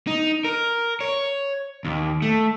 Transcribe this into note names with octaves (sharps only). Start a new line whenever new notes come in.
D#4
A#4
C#5
D#2
A3